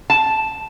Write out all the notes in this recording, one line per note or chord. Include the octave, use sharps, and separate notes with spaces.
A5